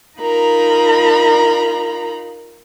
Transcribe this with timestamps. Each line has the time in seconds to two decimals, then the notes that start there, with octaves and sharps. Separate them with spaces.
0.19 D#4 F4 A#4 A#5 B5